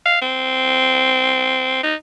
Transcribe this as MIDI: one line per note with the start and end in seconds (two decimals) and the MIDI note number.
0.05 0.18 77
0.21 1.78 60
1.83 1.94 63